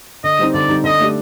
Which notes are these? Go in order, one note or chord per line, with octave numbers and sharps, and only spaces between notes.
D3 D#5
G3 C4 D#4
D3 D5
G3 C4 D#4
D3 D#5
A3 D4 G4